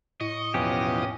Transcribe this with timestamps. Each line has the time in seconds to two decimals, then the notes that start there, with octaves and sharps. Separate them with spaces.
0.21 A2 D#5 C#6
0.54 E2 B2 F3 C#4 G4